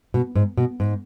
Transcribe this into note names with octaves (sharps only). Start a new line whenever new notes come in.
B2
G#2
B2
G#2